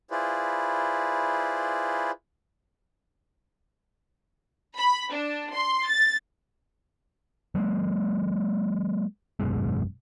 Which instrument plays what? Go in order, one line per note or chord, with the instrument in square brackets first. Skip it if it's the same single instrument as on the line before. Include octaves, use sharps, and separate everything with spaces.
[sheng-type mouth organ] E4 F4 G#4 B4 C5 D5
[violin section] B5
D4
C6
A6
[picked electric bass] F#3 G#3 A#3
G#1 F#2 B2 G#3